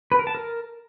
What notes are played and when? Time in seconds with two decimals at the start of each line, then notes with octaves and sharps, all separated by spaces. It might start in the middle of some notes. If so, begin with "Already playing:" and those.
0.12 B4
0.19 A#4
0.27 A5
0.35 A#4